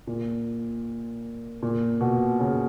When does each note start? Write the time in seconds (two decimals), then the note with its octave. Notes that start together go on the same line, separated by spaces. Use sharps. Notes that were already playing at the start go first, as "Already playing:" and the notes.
0.07 A#2
1.62 A#2
2.01 B2
2.40 C#3